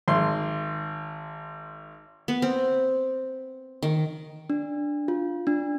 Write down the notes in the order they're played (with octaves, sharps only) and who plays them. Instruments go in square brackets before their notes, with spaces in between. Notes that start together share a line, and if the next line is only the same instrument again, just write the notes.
[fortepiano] G#1 C6
[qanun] B3
C4
D#3
[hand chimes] D4
F4
D4